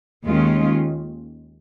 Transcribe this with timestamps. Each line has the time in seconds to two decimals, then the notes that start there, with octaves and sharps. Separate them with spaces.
0.25 D#2 D#3 G#3 C#4 F4